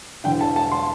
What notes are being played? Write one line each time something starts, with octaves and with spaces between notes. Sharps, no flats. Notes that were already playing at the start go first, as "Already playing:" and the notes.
E1 E2 D3 G5
A5
A5
C6